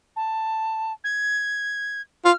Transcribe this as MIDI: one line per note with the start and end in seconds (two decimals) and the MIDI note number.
0.16 0.92 81
1.04 2.01 92
2.25 2.32 65
2.25 2.36 89